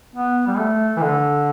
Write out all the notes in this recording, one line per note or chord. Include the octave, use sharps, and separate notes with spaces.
B3
G3
A3
E3
D3